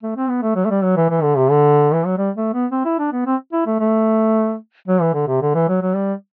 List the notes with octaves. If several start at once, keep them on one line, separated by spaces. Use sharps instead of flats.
A3
C4
B3
A3
F#3
A3
G3
F#3
E3
E3
D3
C3
D3
E3
F#3
G3
A3
B3
C4
E4
D4
B3
C4
E4
A3
A3
F#3
E3
D3
C3
D3
E3
F#3
F#3
G3